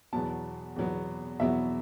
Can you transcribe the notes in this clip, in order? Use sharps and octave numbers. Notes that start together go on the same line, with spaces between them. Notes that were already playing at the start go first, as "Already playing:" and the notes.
E2 B2 F#3 B3 A5
E2 B2 F#3 B3
E2 B2 F#3 B3 E5